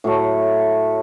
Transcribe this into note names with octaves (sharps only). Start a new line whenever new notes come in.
A2 F#3 A3